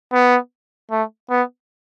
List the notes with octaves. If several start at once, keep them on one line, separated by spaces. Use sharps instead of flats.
B3
A3
B3